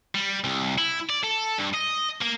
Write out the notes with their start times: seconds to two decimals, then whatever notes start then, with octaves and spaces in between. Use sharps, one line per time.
0.15 G3
0.44 C2
0.78 E4
1.09 D5
1.24 A4
1.58 G2
1.74 D#5
2.22 A#3